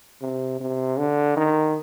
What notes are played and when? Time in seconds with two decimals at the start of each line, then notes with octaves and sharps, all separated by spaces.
0.22 C3
0.60 C3
0.98 D3
1.37 D#3